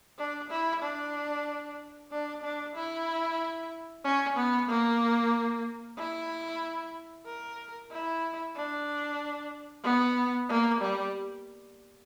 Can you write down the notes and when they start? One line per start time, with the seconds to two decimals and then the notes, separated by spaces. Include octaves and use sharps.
0.18 D4
0.50 E4
0.82 D4
2.11 D4
2.43 D4
2.75 E4
4.04 C#4
4.37 B3
4.69 A#3
5.98 E4
7.26 A#4
7.91 E4
8.56 D4
9.83 B3
10.49 A#3
10.80 G3